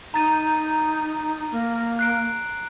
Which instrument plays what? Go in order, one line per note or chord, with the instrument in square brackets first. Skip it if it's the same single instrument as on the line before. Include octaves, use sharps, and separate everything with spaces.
[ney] D#4 [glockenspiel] A#5 A6 D#7
[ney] A#3
[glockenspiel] F#6 C7 D7